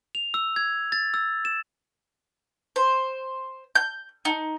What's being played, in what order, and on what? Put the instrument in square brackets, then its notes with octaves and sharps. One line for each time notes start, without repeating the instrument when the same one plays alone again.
[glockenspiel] F7
E6
G#6
A6
E6
E7
[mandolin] C5
G6
D#4